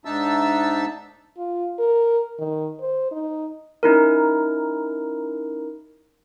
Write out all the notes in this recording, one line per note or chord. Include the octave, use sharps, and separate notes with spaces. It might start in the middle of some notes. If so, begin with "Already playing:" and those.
G#2 D4 D#4 E5 A5 E6
F4
A#4
D#3
C5
D#4
C#4 D#4 E4 A#4